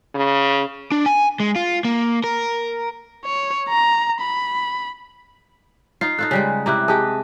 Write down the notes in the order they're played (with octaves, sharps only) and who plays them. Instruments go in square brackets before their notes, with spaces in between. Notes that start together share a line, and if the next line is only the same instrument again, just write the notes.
[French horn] C#3
[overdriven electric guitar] D4
G#5
G#3
F4
A#3
A#4
[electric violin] C#5
A#5
B5
[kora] D#4 F4 [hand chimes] C7
[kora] D#4 F4 A4 [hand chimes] F#6
[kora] C#3 G3 G#3
[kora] C3 C4 E4 [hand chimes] A#5 D6 F#6
[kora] G#3 G4 D#5 [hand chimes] G#4 A5 D#6